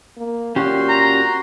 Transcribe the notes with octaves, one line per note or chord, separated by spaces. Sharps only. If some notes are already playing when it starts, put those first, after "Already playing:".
A#3
A#2 C#4 F#4 G4 C6
A#5